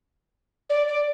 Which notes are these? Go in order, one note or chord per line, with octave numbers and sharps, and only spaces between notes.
D5
D5